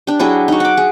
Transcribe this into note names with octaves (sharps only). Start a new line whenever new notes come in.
D4 G4
F#3 E4 G4 G#4
D#4 F#4
F#5 D6
G#4